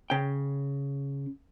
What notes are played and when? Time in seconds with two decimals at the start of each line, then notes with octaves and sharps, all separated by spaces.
0.10 C#3 G5